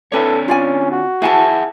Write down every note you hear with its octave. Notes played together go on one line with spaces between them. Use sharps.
D3 C4 E4 A4 B4 C#5 D5
C#4 F4 D5 G#5
F#4
E4 G#4 E5 F#5 G#5 A5